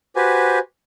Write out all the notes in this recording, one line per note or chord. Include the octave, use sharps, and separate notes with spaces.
F#4 G4 B4 C5 G#5